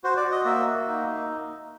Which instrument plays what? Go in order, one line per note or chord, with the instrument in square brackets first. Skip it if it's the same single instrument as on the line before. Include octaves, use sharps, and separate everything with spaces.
[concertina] F#4 C5
D5
F#4
D#5
A#3 E5
A#3
D#4
A#3